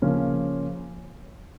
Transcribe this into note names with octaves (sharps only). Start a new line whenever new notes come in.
C#3 F3 A#3 C#4 F4